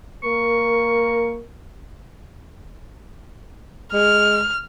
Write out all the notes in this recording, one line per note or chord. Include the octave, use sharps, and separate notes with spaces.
A#3 A#4 C#6
G#3 F6